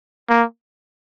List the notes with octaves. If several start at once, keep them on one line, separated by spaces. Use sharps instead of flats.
A#3